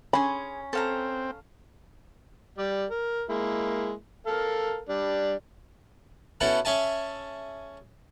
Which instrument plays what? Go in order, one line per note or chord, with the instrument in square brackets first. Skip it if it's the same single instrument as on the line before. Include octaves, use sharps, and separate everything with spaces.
[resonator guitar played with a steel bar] C#4 [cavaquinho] G#4 C6 [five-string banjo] B5
[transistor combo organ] C4 [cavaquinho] A4 F5 A#5
[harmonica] G3 D5
A#4
G#3 A#3 E4
A4 A#4 F5
G3 D4
[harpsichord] B3 C#4 E4 F#4 A4
C#4 G#4 E5 G#5 A5